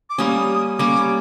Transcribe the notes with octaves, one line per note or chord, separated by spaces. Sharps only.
D6
G3 A#3 C#4 D#6
G3 A#3 C#4 D6